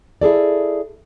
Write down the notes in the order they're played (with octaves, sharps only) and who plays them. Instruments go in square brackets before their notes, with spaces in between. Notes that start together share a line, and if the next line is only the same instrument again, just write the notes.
[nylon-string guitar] E4 G#4 A4 D5